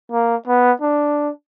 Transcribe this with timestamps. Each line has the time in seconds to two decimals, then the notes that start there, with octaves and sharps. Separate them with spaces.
0.12 A#3
0.47 B3
0.81 D4